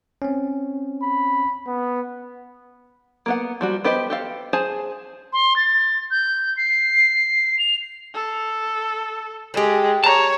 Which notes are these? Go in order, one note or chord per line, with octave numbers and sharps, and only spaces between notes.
C4 C#4
B5
B3
A#3 B3 F#5
F3 G3 F#4
B3 G4 B4 C5 D#5
G4 A4 F5
G#4 C5 G#5 A5
C6
A6
G6
C7
F7
A4
G#3 G4 A4
C#5 A5 A#5